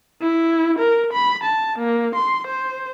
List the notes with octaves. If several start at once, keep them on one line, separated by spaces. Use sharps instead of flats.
E4
A#4
B5
A5
A#3
C6
C5